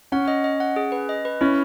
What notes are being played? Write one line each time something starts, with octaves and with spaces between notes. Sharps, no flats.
C#4 F#5
D#5
D#5
F#5
G#4
B4
D#5
B4
C#4 E4